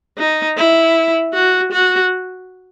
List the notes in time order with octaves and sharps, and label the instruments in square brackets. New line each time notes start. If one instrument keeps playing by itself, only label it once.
[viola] D#4
E4
F#4
F#4